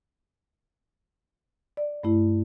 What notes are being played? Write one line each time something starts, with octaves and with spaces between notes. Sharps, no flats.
D5
G2 A3 E4